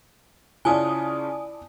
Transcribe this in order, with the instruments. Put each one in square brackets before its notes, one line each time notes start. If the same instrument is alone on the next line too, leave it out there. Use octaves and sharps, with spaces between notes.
[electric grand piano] C#3 C#4 F4 [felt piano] E4 D5 [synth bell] G#5 A5 D#6